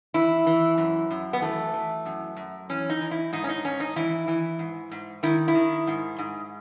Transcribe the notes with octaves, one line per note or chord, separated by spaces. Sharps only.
E3 E4
E3
F#2
F#2
B3
E3 A3
E3
F#2
F#2
E3 C#4
D#4
E3
E4
G#2 D#4
C#4
D#4
G#2 C#4
D#4
E3 E4
E3
G#2
G#2
D#3 E4
E4
D#3
G#2
G#2